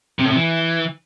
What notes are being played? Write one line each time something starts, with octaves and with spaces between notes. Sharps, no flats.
C3
A2
C3
E3